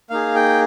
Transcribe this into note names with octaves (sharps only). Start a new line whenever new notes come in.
A#3 D#4 G#4 F5
G5